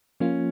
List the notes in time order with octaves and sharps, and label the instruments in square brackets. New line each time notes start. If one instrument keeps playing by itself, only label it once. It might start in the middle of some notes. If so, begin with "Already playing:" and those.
[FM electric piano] F3 A#3 F4 [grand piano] C#4